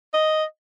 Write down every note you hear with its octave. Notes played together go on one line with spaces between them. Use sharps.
D#5